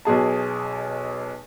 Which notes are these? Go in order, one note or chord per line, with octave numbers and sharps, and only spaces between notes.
B1 B2 G#4 A5